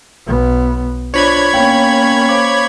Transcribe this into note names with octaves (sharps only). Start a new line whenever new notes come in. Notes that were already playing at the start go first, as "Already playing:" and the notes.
B1 B3
D4 F4 C5 C#5 B5 G#6
A#3 B3 C#4 F5 G5
C5 F5 D6